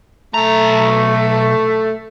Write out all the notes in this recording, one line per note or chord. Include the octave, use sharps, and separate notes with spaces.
B1 A3 A#5